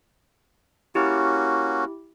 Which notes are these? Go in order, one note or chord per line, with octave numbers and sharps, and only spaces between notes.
A#3 C#4 E4 F#4 G4